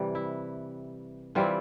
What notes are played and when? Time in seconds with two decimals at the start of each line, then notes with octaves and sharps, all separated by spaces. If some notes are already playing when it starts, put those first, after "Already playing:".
Already playing: C3 E3 G3
0.15 E4
1.35 E3 G3 C4 E4 F4